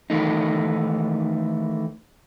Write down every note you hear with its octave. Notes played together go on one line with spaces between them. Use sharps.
D#3 E3 A3 D#4